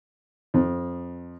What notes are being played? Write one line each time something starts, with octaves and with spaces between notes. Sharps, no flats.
F2